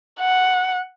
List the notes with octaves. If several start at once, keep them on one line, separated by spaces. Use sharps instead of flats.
F#5